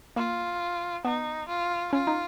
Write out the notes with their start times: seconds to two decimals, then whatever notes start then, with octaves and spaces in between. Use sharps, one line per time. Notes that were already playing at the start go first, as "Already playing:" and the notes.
0.16 A#3 F4
1.05 B3 D#4
1.48 F4
1.93 C#4 F4
2.07 D#4